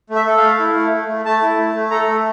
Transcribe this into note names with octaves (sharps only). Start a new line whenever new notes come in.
A3
E5
A4
F5
A3
E4
A3
A3
A3
A3 A5
E4
A3
A3
A4 A#5
A3